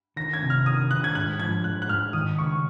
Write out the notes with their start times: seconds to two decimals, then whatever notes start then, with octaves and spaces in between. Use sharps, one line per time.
0.16 D#3 A#6
0.33 G#6
0.42 C3
0.50 F6
0.66 D#3 D#6
0.90 D#3 F#6
1.04 G#6
1.15 G#2 F#6
1.40 F3 G#6
1.64 G#2 F#6
1.82 F#6
1.89 G#2 F6
2.13 D#3 D#6
2.38 C#2 C#6